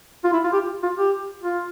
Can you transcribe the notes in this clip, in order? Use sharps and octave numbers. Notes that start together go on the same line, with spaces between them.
F4
E4
F4
G4
F4
G4
F4